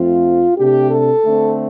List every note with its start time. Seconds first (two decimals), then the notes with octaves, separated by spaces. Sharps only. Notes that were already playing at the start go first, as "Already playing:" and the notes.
Already playing: F2 F3 A3 C4 F4
0.56 C3 A3 D4 G4
0.91 A4
1.25 D3 A3 C4